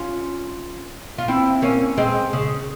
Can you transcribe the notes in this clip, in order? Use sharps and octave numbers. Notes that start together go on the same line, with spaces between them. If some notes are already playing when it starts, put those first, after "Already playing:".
Already playing: C#4 F4
F4
C4 E4
A#3 C#4
G#3 C4
C#3